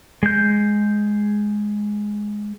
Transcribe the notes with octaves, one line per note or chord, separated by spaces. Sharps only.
G#3 G6